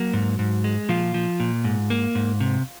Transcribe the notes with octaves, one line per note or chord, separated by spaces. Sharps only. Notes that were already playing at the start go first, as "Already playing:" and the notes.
Already playing: F#3 A#3 F#4
G#2
G#2
G#3
A#2 F3 F4
F3
A#2
G#2
A#3
G#2
C3